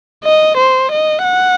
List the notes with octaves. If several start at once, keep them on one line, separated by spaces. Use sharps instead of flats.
D#5
C5
D#5
F#5